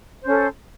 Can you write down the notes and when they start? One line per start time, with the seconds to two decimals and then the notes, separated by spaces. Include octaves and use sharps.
0.21 C5
0.24 C#4
0.27 A4